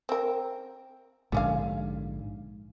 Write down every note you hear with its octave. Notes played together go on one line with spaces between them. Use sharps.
C4 A#4
A#1 G#2 D3 G3 C#4 F5